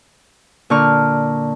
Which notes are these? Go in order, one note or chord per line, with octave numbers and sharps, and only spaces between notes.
A#2 D3 D4 D5 C#6 F6